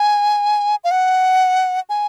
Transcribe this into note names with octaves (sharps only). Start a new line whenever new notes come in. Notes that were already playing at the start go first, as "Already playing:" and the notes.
Already playing: G#5
F5
F#5
G#5